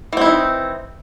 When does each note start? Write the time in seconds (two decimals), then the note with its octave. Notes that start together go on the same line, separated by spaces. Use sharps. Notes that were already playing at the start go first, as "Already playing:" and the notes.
0.13 E3
0.17 C4
0.21 E4
0.26 D#4